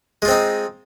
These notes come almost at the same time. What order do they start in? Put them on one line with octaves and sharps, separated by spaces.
G#3 F4 C4 D#4